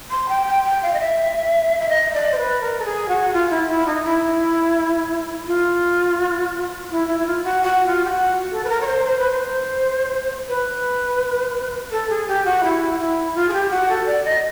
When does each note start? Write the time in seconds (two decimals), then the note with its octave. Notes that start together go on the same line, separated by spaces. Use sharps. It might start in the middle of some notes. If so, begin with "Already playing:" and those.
0.10 C6
0.29 G5
0.46 G5
0.65 G5
0.82 F5
0.94 D#5
0.99 E5
1.80 E5
1.89 D#5
2.14 D5
2.32 C5
2.38 B4
2.61 A#4
2.79 A4
2.85 G#4
3.09 F#4
3.33 F4
3.50 E4
3.68 E4
3.86 D#4
4.04 E4
5.47 F4
6.91 E4
7.08 E4
7.19 E4
7.26 F4
7.44 F#4
7.63 F#4
7.86 F4
8.05 G4
8.10 F#4
8.51 A4
8.64 B4
8.69 A#4
8.81 C#5
8.87 C5
9.05 C5
9.18 B4
9.31 C5
10.48 B4
11.91 A4
12.10 G#4
12.28 G4
12.45 F#4
12.63 E4
13.00 E4
13.35 F4
13.48 G#4
13.53 G4
13.70 F#4
13.89 A4
14.06 D5
14.25 D#5